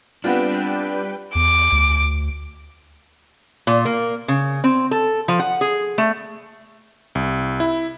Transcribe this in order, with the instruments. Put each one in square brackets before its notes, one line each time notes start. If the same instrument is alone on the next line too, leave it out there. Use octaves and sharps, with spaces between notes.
[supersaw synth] G3 B4 G5 [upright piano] B3 C4 F4 [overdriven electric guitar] D4
[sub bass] E2 [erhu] D6
[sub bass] D2
[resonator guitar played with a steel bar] A#2
A#3
C#3
C4
A4
F3
F#5
G#4
A3
[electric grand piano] C2
E4